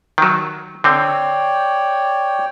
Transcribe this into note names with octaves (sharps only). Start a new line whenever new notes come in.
D#3 F#3
D3 C4 C#5 D5 G5